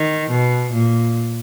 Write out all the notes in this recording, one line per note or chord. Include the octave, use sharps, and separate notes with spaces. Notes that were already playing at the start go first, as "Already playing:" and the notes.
Already playing: D#3
B2
A#2